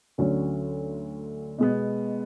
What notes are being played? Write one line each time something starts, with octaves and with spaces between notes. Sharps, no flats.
D2 D3 F#3 C#4
B2 G#3 B3